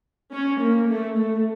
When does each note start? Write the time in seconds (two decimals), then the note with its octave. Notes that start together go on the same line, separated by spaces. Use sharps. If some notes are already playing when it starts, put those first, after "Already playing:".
0.32 C#4
0.60 A#3
0.88 A3
1.17 A3